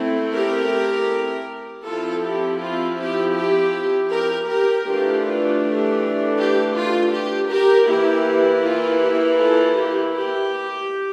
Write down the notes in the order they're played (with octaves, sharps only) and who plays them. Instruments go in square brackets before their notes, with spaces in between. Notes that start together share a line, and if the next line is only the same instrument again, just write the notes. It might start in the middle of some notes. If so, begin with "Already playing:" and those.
Already playing: [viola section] A3 C4 E4
G4 A#4
F3 C4 E4 F4 A4
G4
F4
G4
G4
G4 A#4
G4 A#4
E3 A3 D4 F4 G4
F4
G4
G4
F4
G4
G4 A#4
E3 A#3 E4 G4
F4
G4
F4 A4
G4
G4